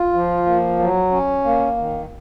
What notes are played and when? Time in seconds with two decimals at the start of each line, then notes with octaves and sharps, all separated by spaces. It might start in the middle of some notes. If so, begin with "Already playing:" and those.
Already playing: F4
0.13 F3
0.46 A#3
0.79 F#3
1.12 C#4
1.44 A#3
1.77 D#3